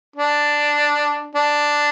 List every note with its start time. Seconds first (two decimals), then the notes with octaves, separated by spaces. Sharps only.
0.16 D4
1.36 D4